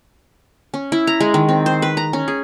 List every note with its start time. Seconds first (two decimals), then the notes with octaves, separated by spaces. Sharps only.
0.74 C#4
0.92 E4
1.07 A#5
1.20 G#3
1.34 D#3
1.49 C4
1.66 C5
1.82 B4
1.97 A#5
2.13 C#4
2.28 G#4